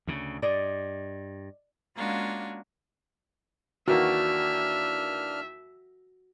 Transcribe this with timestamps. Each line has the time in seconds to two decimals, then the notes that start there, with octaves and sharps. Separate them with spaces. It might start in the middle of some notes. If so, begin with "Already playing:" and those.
0.07 D2 C#3
0.42 G2 D5 D#5
1.96 G#3 A#3 C#4 D4 F4 F#4
3.88 D#2 E3 A#3 D4 F#4 E5 F6